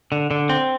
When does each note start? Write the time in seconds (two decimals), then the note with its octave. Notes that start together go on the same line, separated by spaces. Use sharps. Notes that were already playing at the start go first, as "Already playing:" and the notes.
0.12 D3
0.31 D3
0.49 C4